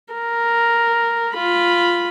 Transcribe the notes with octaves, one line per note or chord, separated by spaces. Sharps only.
A#4
F4 B5